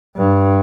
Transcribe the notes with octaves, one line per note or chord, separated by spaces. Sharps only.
G2